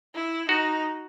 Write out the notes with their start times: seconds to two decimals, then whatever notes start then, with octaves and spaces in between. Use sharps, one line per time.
0.15 E4
0.49 D#4 F#4